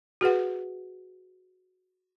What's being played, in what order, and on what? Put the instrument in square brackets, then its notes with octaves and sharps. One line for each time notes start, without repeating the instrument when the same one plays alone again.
[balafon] F#4 G#4 B4 F#5